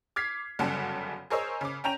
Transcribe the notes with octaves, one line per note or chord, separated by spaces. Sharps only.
D6 F6 G#6 B6 C7
G1 F#2 C#3 G3 F#5 A5
G#4 A#4 C5 C#5 D#5 E6
C#3 D6
C#4 G5 A#5 F7